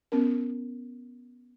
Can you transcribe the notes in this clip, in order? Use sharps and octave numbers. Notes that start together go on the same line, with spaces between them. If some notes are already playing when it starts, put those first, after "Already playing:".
B3 C#4 A#4